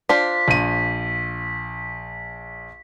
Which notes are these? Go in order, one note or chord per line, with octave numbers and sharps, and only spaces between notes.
D4 F4 C5 B6
A#1 D#7